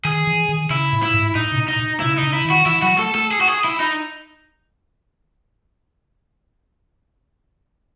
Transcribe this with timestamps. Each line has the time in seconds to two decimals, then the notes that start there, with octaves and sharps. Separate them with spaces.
0.05 D#3 G#4
0.27 E3
0.49 D#3
0.70 C#3 E4
0.92 A2
1.03 E4
1.13 G#2
1.35 A2 D#4
1.52 C#3
1.57 B2
1.68 D#4
1.79 B2
2.00 C#3 E4
2.18 C#3 D#4
2.33 E4
2.45 D#3
2.50 F#4
2.66 E3 E4
2.82 F#3 F#4
2.98 A3 A4
3.15 A3 A4
3.31 G#4
3.41 F#4
3.47 G#4
3.64 E4
3.80 D#4